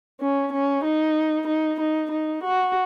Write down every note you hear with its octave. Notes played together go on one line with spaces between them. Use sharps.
C#4
C#4
D#4
D#4
D#4
D#4
F#4